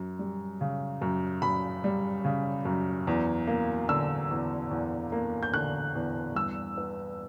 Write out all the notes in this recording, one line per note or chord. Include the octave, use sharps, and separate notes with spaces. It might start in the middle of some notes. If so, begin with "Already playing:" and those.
Already playing: F#2
G3
C#3
F#2
F#2 B5
G3
C#3
F#2
E2
A#3
D3 E6
E2
E2
A#3
G6
D3 F#6
E2
G2 E6
B3